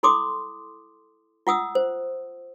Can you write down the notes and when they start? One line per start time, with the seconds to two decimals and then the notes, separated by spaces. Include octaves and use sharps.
0.03 E4 A4 C6 D6 D#6
1.47 F4 F#5 D#6 E6
1.75 C5